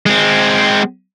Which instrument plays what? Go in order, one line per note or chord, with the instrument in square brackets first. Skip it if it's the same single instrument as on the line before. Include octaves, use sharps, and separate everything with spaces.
[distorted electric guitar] G#3 C4